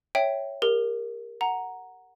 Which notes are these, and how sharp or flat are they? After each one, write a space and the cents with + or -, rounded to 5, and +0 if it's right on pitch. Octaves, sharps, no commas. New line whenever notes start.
C#5 +0 E5 +0 G5 +0
G4 +35 A#4 +0
F#5 +0 A#5 +0